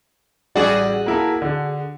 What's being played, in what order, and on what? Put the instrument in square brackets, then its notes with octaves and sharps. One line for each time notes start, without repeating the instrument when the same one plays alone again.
[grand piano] A1 G3 D5 [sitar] F#4 G#4
[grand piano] A#3 E4 A4
D3